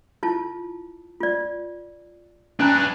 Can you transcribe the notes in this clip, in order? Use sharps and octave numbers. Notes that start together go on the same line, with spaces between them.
E4 F4 A5
F4 D5
C#4 D4 B4 G#5 A#5